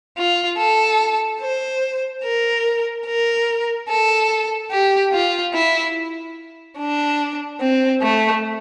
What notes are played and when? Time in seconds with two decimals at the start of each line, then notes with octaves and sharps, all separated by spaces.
0.17 F4
0.58 A4
1.41 C5
2.24 A#4
3.06 A#4
3.89 A4
4.71 G4
5.13 F4
5.54 E4
6.78 D4
7.60 C4
8.01 A3